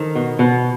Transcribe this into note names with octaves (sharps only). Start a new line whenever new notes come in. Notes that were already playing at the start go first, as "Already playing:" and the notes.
Already playing: D#3 A4 C5
B2
B2